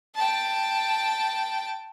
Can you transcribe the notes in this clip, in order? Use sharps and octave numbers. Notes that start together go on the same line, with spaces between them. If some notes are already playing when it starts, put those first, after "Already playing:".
G5 A5